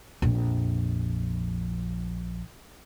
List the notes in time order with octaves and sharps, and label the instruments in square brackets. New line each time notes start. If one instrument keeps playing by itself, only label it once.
[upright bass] A#1 F2